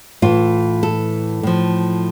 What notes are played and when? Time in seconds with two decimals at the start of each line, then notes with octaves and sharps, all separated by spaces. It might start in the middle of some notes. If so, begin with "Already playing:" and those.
0.22 A2 E3 F4
0.83 A4
1.43 A2 F3